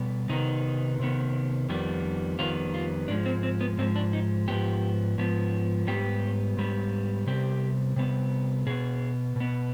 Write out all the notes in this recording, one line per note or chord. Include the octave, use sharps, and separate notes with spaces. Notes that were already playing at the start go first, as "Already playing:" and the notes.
Already playing: B2 G3 B3
C3 D#3 B3 D#4
C3 D#3 B3
F2 D#3 G3 B3
F2 D#3 G3 B3 F4
F4
G#2 F3 G#3 D4
C4
C4
B3
G#2 F3 G#3 C4
D4
D#4
G#2 F3 B3 G4
G#2 F3 B3
G#2 G3 B3 G4
G#2 G3 B3
C3 G3 B3 G4
C3 G3 B3
B2 B3 G#4
B2 B3